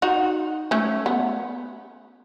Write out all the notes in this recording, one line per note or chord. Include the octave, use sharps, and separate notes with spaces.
D#4 F#4
A3 C#4
B3